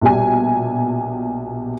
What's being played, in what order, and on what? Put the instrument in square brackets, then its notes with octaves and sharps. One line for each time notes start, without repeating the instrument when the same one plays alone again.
[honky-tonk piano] A#1 B2 G3 G#5